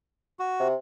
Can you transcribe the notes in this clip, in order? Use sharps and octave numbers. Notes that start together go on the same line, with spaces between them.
F#4
C3